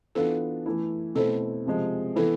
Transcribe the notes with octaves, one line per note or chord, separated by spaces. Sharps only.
E3 B3 D4 F4 A4
E3 A3 E4
B2 A3 C4 E4 A4
C3 F3 G#3
E3 B3 E4 A4